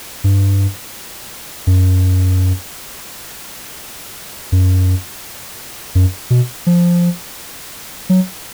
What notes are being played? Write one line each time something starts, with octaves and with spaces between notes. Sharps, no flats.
G2
F#2
F#2
F#2
B2
F3
F#3